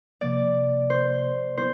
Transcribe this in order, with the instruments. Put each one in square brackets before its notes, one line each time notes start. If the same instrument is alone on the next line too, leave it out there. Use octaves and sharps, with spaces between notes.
[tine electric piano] C3 F3 A#3 [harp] D5
[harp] C5
[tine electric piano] F#3 B3 E4 [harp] C5